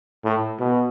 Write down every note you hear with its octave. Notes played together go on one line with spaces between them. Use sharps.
A2
B2